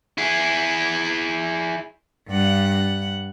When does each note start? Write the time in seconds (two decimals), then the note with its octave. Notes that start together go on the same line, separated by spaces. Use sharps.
0.18 E4 G#4
2.28 G2 F#5